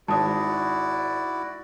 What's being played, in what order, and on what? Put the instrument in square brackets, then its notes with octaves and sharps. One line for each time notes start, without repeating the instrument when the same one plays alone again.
[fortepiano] G#1 [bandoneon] E4 F#4 D5 [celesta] A5 D#6